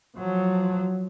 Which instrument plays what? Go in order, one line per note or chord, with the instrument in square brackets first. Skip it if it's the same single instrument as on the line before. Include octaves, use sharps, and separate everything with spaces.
[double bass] F3 F#3